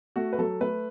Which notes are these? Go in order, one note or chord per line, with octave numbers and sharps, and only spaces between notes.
A3 F#4
B4
F#3 A4
A3 B4